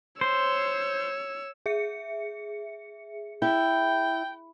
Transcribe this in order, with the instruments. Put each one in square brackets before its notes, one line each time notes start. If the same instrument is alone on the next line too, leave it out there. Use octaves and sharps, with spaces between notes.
[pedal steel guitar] C5 [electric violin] C#5 E6
[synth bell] G#4 E5 C#7
[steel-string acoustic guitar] E4 [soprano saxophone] G5